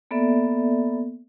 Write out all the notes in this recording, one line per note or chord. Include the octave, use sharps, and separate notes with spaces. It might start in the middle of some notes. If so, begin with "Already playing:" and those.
A#3 B3 A4 D5 E5